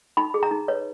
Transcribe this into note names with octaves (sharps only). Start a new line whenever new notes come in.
D#4 B5
G#4
A#5
D#4
B4 C#5